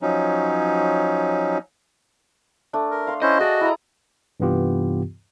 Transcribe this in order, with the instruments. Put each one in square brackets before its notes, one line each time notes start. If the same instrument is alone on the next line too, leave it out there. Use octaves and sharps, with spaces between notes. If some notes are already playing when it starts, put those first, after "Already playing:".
[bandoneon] F3 F#3 C#4 D#4
[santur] A3 D4
[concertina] A#4
[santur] F5 C6
[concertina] C#4 E4 C5 [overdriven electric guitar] D#5 [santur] C#6
[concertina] F#4 [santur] G#4 D5 A5
[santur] E4 A#5
[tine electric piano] G2 C3 E3 B3 F4 G4